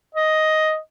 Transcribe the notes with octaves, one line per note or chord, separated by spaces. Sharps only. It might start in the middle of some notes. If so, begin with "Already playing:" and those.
D#5